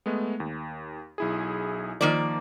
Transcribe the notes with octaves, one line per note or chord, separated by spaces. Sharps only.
G#3 A3 B3
D#2
B1 E4 G#4
D#3 F3 A#3 D5